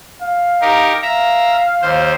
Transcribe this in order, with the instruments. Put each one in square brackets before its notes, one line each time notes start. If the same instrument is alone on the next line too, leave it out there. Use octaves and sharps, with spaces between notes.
[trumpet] F5
[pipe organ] D#4 G4 A#4
[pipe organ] E5 A#5 [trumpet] F5
[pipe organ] D#2 C5